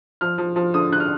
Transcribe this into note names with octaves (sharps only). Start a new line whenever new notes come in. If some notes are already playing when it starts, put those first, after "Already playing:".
F3 F6
F3
F3
D3 D#6
D3 F#6
F6